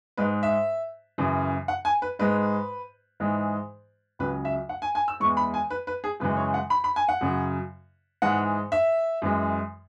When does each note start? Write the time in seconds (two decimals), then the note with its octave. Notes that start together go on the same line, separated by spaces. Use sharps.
0.17 G#2 G#3 B4
0.43 E5
1.18 F#2 C#3 E3
1.68 F#5
1.85 G#5
2.02 B4
2.19 G#2 G#3 B4
3.20 G#2 E3 G#3
4.19 C#2 C#3 F#3 B4
4.45 E5
4.69 F#5
4.82 G#5
4.95 G#5
5.08 E6
5.20 E2 E3 G#3 C#6
5.37 B5
5.54 G#5
5.71 B4
5.87 B4
6.04 G#4
6.20 F#2 C#3 E3 G#3 B4
6.37 C#5
6.54 F#5
6.70 B5
6.84 B5
6.96 G#5
7.09 F#5
7.21 F#2 C#3 F#3
8.22 G#2 E3 G#3 F#5
8.72 E5
9.22 F#2 E3 G#3